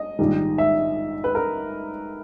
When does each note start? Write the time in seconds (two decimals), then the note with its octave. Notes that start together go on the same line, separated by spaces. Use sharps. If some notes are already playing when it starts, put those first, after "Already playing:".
Already playing: D#5
0.19 A#1 G#2 D#3 G3
0.58 E5
1.24 B4
1.35 A#4